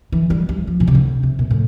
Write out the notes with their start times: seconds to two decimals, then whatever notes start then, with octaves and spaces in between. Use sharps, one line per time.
0.12 E3
0.30 G3
0.49 G3
0.67 F3
0.80 A#2
0.87 C3
0.95 D3
1.23 C3
1.39 A#2
1.50 A2